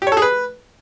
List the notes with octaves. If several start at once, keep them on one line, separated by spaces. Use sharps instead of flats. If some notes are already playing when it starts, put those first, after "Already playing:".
G4
C#5
A4
G#4
B4